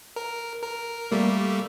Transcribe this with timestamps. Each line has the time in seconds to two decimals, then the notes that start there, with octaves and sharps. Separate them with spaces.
0.16 A#4
0.62 A#4
1.11 G3 A3 A#3